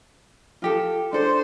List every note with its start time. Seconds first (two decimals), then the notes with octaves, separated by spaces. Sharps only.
0.62 F4 G4 A4
1.13 D4 A4 C5 D5